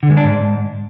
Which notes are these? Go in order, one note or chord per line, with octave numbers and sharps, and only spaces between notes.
D3
G#3
D4
G#2